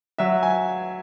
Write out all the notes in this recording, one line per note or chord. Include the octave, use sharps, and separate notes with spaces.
F#3 E5
G#5